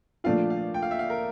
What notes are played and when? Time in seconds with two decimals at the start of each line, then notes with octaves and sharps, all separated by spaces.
0.24 A#2 F3 A3 D4 F4 F5
0.50 F5
0.74 G5
0.82 F5
0.91 E5
0.99 F5
1.10 A#4